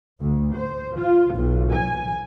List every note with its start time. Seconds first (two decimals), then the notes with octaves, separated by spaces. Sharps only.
0.21 D2
0.54 C5
0.96 F4
1.34 B1
1.73 G#5